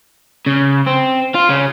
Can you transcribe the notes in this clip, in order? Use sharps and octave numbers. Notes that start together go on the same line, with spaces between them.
C#3
C4
F4
C#3